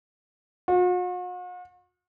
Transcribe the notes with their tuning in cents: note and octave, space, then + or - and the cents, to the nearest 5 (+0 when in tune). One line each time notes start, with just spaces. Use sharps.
F#4 -45